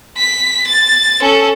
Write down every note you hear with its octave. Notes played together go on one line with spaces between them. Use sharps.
B6
A6
C#4 A4